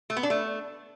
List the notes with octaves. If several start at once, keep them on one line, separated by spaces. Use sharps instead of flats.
A3
B3
D4
A3